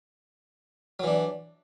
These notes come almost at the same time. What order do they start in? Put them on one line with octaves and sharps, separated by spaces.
F#3 E3 D4